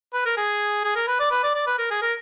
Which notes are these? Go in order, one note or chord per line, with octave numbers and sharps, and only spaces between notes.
B4
A#4
G#4
G#4
A#4
B4
D5
B4
D5
D5
B4
A#4
G#4
A#4